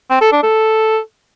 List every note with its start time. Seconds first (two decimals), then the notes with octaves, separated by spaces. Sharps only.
0.10 C4
0.21 A4
0.32 D4
0.43 A4